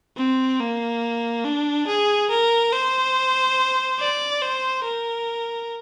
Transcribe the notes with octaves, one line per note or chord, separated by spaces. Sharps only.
C4
A#3
D4
G#4
A#4
C5
D5
C5
A#4